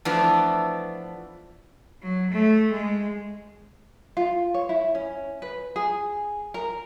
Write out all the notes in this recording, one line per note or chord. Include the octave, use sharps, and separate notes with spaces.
E3 F3 A3 B3 D4
F#3
A3
G#3
F4
C#5
E4
C#4
B4
G#4
A#4